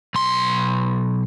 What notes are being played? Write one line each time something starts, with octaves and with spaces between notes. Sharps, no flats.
B1 C6